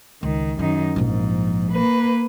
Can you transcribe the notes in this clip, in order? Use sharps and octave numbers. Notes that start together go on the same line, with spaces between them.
C#2 D#3
F#2 D#3 D#4
A#1 G#2 F3
A#3 B4